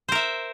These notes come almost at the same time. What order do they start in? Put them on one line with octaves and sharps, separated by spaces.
C5 A#4 E5